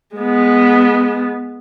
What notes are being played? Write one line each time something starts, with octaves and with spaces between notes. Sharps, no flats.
G#3 B3